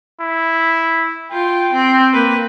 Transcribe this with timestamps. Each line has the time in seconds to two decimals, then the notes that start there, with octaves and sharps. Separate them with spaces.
0.22 E4
1.32 F4 G5
1.72 C4
2.13 A#3 B4